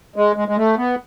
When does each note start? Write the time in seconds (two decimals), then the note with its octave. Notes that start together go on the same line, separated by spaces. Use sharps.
0.16 G#3
0.36 G#3
0.48 G#3
0.57 A3
0.77 B3